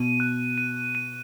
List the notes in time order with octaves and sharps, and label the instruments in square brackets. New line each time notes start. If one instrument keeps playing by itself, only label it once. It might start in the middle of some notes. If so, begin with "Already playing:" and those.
Already playing: [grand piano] B2 [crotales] D#7
[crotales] F#6
D#7
D#7